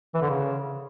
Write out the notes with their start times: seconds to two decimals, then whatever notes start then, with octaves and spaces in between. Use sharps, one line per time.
0.14 E3
0.22 D3
0.29 C#3